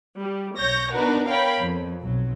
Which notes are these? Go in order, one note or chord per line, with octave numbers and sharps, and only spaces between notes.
G3
B1 C#5 G6 A#6
B3 D4 D#4 F#4 A#4 B4
A#4 C#5 F5 G5 B5
F2
B1 F#3